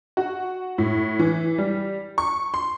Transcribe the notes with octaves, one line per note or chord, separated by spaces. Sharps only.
F#4
A2
E3
G3
C#6
C6